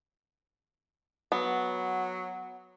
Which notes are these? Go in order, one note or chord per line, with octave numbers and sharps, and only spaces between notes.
F#3 B3